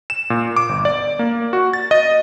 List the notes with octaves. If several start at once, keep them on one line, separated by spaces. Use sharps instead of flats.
E7
A#2
D6
G1
D5
A#3
F#4
A6
D#5